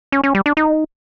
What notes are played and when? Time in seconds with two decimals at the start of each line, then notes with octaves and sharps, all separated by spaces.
0.12 C#4
0.24 C#4
0.35 G3
0.46 D4
0.57 D#4